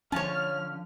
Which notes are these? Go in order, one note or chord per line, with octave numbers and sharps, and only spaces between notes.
D3 F3 C#4 C#5 A5 F6